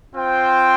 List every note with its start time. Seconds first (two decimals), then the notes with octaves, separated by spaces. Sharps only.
0.14 C4 F4 C5 G5